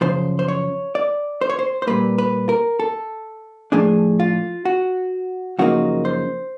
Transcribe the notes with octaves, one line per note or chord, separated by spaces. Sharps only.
F#2 C#3 F3 C5
C5
C#5
D5
C5
C#5
C5
C5
A#2 G3 A#3 B4
B4
A#4
A4
A2 F3 A3 D4 G#4
F4
F#4
F#2 C#3 F3 A#3 D#4 F#4
C5